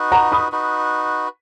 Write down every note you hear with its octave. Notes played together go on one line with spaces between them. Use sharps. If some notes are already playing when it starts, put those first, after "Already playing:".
Already playing: D#4 F#4 B4
F#5 A#5
B5 D#6
D#4 F#4 B4